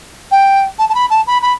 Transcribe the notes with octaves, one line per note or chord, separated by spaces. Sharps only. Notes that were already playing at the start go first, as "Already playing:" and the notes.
G5
A5
A5
B5
A5
B5
B5